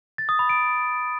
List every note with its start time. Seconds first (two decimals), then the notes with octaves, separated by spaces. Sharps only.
0.18 A6
0.29 D#6
0.39 B5
0.49 D7